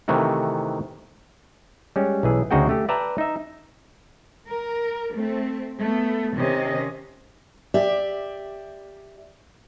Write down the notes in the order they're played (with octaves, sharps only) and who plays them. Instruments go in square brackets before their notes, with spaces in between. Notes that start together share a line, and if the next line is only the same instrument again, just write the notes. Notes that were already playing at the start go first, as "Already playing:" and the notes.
[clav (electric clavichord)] C3 D#3 E3 A3 F#4
G3 G#3 C#4
B1 E3 G#4
D2 C#3 D#4 F#4 G#4 G5
A3 G4
B4 D5 E5 G5 A5 A#5
D#4 E5
[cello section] A#4
A3 C4
A3 B3
C3 D#3 C#4 D#5
[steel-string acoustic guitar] G4 D5 E5